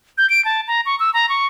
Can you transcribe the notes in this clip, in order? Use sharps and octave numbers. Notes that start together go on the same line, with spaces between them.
G6
D7
A5
A#5
C#6
E6
A#5
C#6